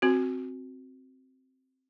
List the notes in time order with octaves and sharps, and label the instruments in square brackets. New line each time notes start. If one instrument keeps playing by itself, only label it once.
[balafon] C4 F#4